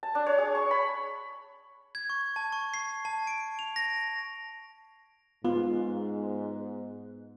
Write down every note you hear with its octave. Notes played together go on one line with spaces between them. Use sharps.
A5
D4
C#5
G#4
C#6
B5
G#6
C#6
A5
C#6
C7
A5
D7
F7
A#6
G#2 B3 F4